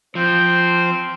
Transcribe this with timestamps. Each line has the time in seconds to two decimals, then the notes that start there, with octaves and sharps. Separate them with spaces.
0.15 F3 C4 C5